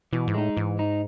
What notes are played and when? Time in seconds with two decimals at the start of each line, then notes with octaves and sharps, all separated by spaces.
0.13 B2 E3
0.27 G#2
0.34 A2 G#3 D#4
0.57 G#2 E3
0.79 G#3 D#4